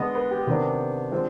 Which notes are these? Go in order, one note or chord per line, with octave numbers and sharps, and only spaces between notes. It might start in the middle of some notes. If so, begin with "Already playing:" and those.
Already playing: D3 G#3 B3 D#5
B4
G4
C3 D#3 B3 D4
D3 F3 G#3 C4